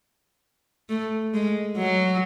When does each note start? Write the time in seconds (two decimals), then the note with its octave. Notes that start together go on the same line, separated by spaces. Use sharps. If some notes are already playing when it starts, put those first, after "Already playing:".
0.89 A3
1.34 G#3
1.77 F#3